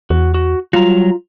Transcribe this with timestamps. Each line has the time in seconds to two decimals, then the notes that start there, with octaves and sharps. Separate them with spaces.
0.10 E2 F#4
0.34 F#4
0.73 F#3 G3 F4 A#5